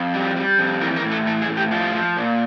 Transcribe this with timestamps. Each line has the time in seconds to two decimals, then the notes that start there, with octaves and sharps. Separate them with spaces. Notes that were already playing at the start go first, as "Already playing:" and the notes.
Already playing: F2
0.14 G3
0.36 G3
0.59 F2
0.81 E3 A#4
0.96 A#4
1.04 A2
1.11 A4
1.26 E3 A4
1.42 G#4
1.49 A2
1.57 G4
1.71 F3 F4
1.94 F3
2.17 A#2